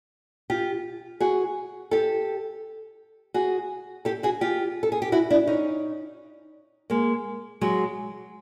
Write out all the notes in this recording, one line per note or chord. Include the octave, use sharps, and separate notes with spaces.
F4 G4
F#4 G#4
G4 A4
F#4 G#4
G4 A4
F#4 G#4
F4 G4
A4
G#4
G4
E4 F#4
D4 E4
C#4 D#4
G#3 A#3
F#3 G#3